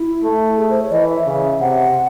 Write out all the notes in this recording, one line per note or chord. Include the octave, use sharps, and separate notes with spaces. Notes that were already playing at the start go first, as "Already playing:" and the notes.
Already playing: E4
A3
G#4
C5
C#5
E3 D#5
E5
C#3 E5
C3 F#5